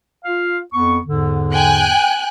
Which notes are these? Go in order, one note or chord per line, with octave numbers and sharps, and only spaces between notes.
F4 F5
F2 B3 C#6
E2 G#2 D3
G5 G#5 F#6